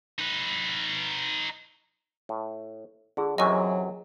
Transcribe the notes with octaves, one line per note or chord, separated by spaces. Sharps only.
D#4 B4
A2
D3 F4 G#4
F#2 C3 E3 F#3 D#5 G#5 A#5 C#6